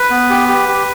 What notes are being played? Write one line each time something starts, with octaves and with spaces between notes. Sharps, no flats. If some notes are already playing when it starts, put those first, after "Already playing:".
Already playing: B4
B3
G4
G4
G4